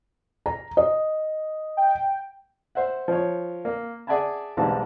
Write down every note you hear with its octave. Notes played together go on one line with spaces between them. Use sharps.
A#5
D#5
G5
C5 E5 F#5
F3 C#5
A#3
G#4 D5 E5 F#5 G#5 A5
B1 G#2 E3 G3 G#3 A5